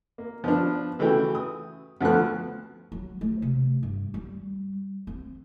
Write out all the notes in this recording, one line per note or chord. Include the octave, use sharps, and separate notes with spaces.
A#3
F3 B3 D4
C#3 E3 A3 F#4 G5
D#6
D2 F3 B3 A4 F#6
F#3
A3
C3
G2
G3
C4